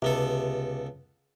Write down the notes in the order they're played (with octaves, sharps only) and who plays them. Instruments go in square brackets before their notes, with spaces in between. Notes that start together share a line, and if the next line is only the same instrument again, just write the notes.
[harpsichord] C#2 B3 A4 [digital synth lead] C3